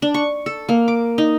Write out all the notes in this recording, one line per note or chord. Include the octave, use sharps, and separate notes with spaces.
D4
C#6
A4
A#3
D6
D#4